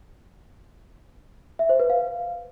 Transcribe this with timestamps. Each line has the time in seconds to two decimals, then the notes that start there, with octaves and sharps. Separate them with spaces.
1.59 E5
1.69 C5
1.80 B4
1.90 F5